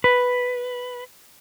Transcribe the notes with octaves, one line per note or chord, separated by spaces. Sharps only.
B4